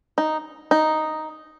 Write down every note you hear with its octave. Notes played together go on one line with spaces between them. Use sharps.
D#4
D#4